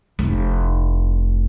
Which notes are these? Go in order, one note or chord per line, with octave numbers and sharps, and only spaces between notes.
F1 E4